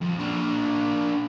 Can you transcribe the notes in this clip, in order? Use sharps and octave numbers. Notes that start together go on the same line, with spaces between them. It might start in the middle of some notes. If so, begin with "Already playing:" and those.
F2
A#3 D4